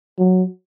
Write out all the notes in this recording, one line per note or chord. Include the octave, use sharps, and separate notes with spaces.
F#3